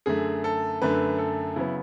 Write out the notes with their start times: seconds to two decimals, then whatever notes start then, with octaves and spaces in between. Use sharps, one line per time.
0.06 F#2 D3 A3 G#4
0.44 A4
0.82 F#2 D3 A3 B4
1.18 A4
1.56 C#3 F#3 B3 E4